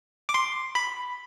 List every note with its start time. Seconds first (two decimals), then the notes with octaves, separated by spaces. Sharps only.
0.29 D6
0.34 C6
0.75 B5